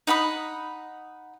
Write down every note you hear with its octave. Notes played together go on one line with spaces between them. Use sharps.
D#4 F#5 B5 D#6